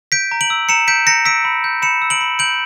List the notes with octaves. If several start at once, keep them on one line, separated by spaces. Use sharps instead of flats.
G6 B6 D7
A#5
D7 F#7
E6
A#5 C#7 E7
G6 B6 D7
A#5 A#6 C#7
E6 B6 D7
B5
G6
B5 C#7 E7
E6
D7 F#7
B5
G6 D7 F#7